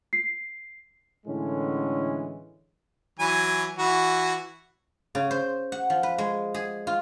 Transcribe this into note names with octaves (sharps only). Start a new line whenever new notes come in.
C7
A2 D3 E3 G#3 C#4
E3 F#3 G#5
E3 F#4
C#3
C5
F#5
F3
B4
G#3
G#4
F4